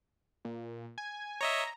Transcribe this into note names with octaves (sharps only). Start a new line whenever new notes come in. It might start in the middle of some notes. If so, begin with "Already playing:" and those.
A#2
G#5
C#5 D#5 E5 A#5